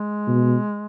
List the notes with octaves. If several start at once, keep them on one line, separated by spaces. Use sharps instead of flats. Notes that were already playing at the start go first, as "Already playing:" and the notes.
Already playing: G#3
B2